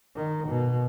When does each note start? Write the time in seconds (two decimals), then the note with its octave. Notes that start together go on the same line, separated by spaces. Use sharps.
0.16 D#3
0.48 B2